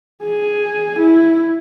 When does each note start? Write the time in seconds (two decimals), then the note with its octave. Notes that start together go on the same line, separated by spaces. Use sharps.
0.23 G#4
0.99 E4